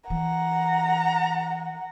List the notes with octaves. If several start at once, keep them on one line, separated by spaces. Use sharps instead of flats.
E3 F#5 A#5